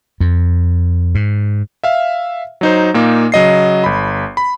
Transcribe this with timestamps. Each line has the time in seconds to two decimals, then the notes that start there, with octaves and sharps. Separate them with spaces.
0.20 F2
1.15 G#2
1.84 E5 F5
2.61 F#3 D#4 C5
2.94 A#2 A#3 D#4
3.32 C#3 F#3 D#5 C7
3.84 G1 B5
4.37 B5